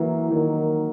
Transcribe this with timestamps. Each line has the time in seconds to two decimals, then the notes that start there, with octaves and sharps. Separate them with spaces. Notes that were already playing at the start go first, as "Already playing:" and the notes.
Already playing: E3 F#3 A#3
0.31 D#3 F#3 A#3